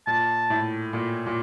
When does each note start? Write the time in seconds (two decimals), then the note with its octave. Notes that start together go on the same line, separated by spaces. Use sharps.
0.07 A#2 A5
0.50 A2
0.93 A#2
1.26 A#2